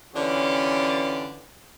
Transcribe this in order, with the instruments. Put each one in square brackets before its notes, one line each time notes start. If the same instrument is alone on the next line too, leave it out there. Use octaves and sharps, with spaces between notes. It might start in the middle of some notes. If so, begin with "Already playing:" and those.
[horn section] D3 E3 C#4 D4 F4 G4